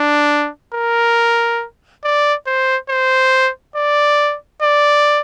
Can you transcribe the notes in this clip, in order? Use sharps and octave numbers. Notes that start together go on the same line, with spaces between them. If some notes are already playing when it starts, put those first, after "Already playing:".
Already playing: D4
A#4
D5
C5
C5
D5
D5